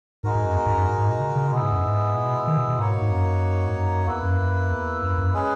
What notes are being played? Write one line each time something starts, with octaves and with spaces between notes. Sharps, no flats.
G#2 G#3 D#4 F#4 A#4
G#2
F#2
E2
G#2
F#2
G#2
G#2
A#2
C#3
C#3
B2 G#3 B3 E4
G#2
F#2
G#2
A#2
B2
D#3
B2
B2
G#2 A#3 D#4 F#4 C#5
G#2
F#2
G#2
F#2
E2 A#3 E4 B4
F#2
E2
F#2
F#2
G#3 C#4 G#4 B4